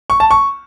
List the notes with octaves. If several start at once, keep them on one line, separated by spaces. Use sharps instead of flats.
C#6
A5
C#6